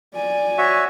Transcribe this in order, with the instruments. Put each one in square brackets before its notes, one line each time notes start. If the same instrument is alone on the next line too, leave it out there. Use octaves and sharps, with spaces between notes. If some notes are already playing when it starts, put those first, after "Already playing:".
[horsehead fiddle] D5 G#5
[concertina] F#4 C#5 E5